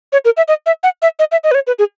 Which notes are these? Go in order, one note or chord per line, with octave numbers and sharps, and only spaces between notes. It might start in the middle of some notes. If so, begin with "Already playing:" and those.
C#5
A#4
E5
D#5
E5
F#5
E5
D#5
E5
D#5
B4
C#5
B4
G#4